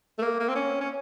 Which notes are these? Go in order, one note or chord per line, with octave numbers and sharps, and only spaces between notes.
A3
A#3
A#3
C4
C#4
C#4